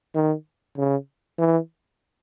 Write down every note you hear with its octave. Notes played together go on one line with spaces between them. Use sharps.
D#3
C#3
E3